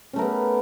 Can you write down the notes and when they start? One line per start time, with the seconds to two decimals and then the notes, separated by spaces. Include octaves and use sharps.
0.13 C#4
0.16 A3
0.19 A#4
0.21 B3